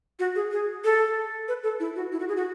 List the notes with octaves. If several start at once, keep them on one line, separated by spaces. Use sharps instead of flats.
F#4
G#4
G#4
A4
B4
A4
E4
F#4
E4
F#4
G#4
F#4